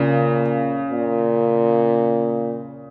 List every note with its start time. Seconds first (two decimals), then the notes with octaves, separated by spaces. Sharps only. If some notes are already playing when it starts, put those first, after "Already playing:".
Already playing: A#2 C#3
0.91 A#2